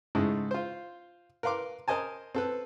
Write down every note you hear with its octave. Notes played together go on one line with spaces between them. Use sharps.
G#2 C#3 G#3 A3 E4
F4 C5
A#4 B4 F5 C6 D6
A#4 C5 D#5 G#5 A5
C4 A4 B4